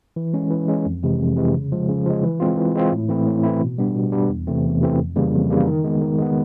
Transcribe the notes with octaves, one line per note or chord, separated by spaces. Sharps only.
E3
G#3 C#4
E3
G#3 C#4
F2
C3 E3 G#3
F2
C3 E3 G#3
C#3
F3 G#3
C#3
F3 G#3
E3
G#3 C4 F4
E3
G#3 C4 F4
A2
E3 A3 C4 E4
A2
E3 A3 C4 E4
B2
G3 B3 D4
B2
G3 B3 D4
E2
C3 E3 A3 C4
E2
C3 E3 A3 C4
F2
C#3 E3 G3 A#3
F2
C#3 E3 G3 A#3
D#3
G#3 B3
D#3
G#3 B3